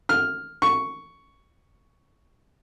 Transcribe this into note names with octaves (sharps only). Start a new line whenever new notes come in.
F6
C#6